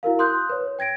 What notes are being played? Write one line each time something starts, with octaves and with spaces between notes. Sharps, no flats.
E4 F#4 A#4 F5
C6 D#6 F#6 G6
B4 C#5
G5 G#6 A#6 D7